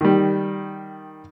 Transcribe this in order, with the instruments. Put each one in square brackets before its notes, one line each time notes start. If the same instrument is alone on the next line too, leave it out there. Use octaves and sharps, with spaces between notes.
[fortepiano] D#3 G3